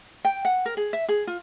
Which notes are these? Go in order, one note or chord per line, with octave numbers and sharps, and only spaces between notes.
G5
F#5
A#4
G#4
E5
G#4
F4